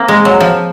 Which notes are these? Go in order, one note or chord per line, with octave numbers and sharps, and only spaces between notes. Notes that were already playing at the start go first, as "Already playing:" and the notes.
Already playing: A#3 C4
G#3
F#3
F3